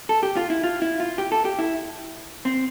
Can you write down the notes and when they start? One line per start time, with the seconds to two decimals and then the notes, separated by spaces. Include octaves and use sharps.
0.09 A4
0.23 G4
0.36 F4
0.50 E4
0.64 F4
0.82 E4
1.00 F4
1.18 G4
1.32 A4
1.45 G4
1.59 E4
2.45 C4